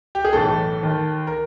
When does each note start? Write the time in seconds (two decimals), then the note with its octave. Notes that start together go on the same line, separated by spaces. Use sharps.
0.15 G4
0.25 G#4
0.33 B1 A2 E3 A3 A4
0.83 D#2 D#3
1.27 A#4